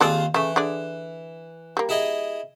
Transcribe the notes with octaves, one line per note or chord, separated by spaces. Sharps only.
D#2 G#3 C4 F4 A4 D5
C#3 E3 A3
D3 G#4 D5
G3 A#3
E4 G#4 D#5